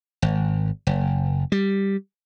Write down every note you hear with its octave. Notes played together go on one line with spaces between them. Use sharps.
G#1
F#1
G3